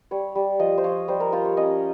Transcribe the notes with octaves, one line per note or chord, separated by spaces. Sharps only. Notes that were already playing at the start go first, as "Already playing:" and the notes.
G3 C#5
G3
F3 D#5
C5
F3 C#5
G3 C5
A#4
F4 C5
C#5
C#4 D#5